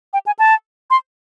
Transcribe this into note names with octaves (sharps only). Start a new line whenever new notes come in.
G5
G#5
A5
C6